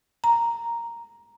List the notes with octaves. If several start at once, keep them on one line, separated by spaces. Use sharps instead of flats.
A#5